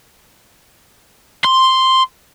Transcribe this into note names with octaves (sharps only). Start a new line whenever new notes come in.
C6